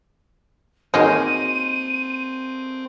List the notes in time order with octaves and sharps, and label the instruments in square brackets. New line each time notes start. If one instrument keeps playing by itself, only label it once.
[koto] A#3 D#4 [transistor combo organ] C4 [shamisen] F#4 G#4 C#5 [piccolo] D#7